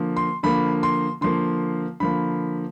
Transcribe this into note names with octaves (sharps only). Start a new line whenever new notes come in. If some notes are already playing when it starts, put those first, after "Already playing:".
Already playing: D3 F3 A#3
C6
D3 F3 A#3 B5
C6
D3 F3 A#3 C6
D3 F3 A#3 B5